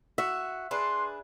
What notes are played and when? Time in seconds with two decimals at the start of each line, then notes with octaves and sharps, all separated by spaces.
0.18 F#4 E5
0.71 D4 G#4 B4 C6